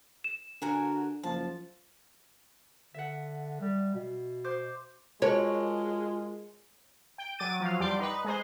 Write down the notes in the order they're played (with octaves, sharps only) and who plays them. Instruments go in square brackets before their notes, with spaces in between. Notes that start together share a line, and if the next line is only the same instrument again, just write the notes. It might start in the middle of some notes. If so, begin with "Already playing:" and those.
[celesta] E7
[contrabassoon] D3 [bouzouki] F#4 A#4 G#5
[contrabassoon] F#1 [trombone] F3 [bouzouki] A5
[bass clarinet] D3 [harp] E5 F#5
[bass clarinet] G3
B2
[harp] C5 D6 G6
[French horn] G#3 [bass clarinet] F4 [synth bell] F#4 A#4 A5 [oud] C#5
[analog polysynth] G5
F#3 D6 A6 D#7
F3 F#3 F5
E2 G3 G4 D5 C6 D6
D#4 B4
G#3 G#4 C5